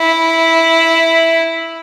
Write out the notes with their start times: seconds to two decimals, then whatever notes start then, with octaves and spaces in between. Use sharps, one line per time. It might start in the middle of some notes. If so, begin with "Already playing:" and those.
Already playing: E4